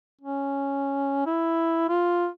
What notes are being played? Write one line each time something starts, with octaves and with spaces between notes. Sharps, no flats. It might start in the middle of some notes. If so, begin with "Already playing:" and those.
C#4
E4
F4